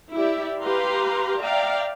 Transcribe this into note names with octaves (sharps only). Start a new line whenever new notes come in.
E4 G4 D5 E5
G4 B4 F5 A#5 C6
D5 E5 F5 G5 A#5